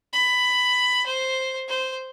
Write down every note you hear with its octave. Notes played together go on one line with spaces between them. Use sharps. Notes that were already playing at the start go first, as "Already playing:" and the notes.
B5
C5
C5